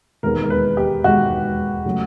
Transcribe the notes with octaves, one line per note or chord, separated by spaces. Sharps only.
E1 D#2 D#3 G#3 B3 A#4
A#4
B4
G4
E1 D#2 D#3 G#3 B3 F#4
C#3 F#3 A3